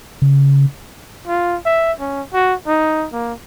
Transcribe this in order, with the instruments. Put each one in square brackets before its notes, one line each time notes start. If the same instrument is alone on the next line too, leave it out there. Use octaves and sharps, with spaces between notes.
[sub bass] C#3
[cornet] F4
E5
C#4
F#4
D#4
A#3